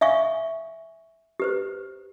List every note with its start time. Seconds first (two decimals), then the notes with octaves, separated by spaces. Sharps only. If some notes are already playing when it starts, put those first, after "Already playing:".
0.01 E5 F5 G#5 C#6
1.40 G4 B4 C5